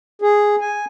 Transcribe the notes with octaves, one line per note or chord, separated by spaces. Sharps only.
G#4
G#5